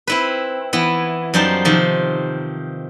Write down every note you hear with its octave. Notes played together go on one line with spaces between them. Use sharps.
C4 E4 B4
E3 B3 E4
F#2 G3 D#4 F4 C5 A5
C3 D#3 F3